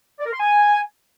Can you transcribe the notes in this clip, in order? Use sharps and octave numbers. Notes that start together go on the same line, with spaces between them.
D5
A#4
C6
G#5